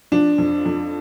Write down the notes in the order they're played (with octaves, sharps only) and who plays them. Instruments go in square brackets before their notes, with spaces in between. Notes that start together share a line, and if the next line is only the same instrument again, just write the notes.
[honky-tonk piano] F3 [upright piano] D4
[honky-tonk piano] F2
F2